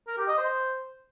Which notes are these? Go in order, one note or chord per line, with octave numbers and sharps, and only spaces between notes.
A#4
G4
D#5
C5